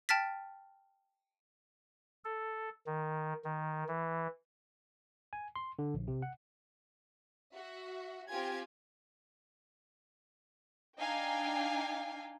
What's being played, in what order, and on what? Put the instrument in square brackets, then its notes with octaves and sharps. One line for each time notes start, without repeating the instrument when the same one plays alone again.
[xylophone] G5 A5 F6 A6 B6
[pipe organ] A4
D#3
D#3
E3
[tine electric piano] G#5
C6
D3
A#1
C3
F#5
[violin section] F#4 E5
C4 F4 G4 G#5 G#6
D4 D#4 F5 G5 G#5